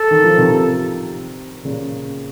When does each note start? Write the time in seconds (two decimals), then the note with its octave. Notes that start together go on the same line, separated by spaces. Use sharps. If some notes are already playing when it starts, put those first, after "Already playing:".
Already playing: A4
0.11 D#3
0.24 F3
0.38 C3 D#3
1.65 A#2 C#3